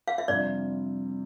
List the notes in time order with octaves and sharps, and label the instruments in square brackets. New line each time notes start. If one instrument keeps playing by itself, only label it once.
[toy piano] F5
E5
[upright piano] F2 C3 G3 D4 F4 [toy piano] D5